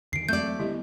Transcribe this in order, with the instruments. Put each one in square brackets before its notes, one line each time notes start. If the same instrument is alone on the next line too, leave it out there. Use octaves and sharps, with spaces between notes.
[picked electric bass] E2 D3 D#3 [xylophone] C7 D7
[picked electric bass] E2 F#3 C4 [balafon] G#3 [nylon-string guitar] A3 D5 [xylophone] G6
[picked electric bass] D3 G3 B3 [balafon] E4 G4 D#5